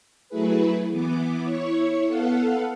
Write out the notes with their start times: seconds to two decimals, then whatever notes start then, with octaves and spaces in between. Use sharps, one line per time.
0.29 F#3 A3 E4 G#4 B4
0.90 E3 B3 D6
1.44 E4 C#5 C#6
2.06 B3 A4 F5 F#5